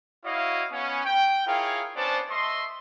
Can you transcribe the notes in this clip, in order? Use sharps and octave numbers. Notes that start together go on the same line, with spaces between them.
E4 F#4 C#5 D#5 F5
B3 C#4
G5
E4 F4 G#4 A#4 C#5 F5
B3 C#4 D4 C5 D5 A5
A3 D#5 E5 C6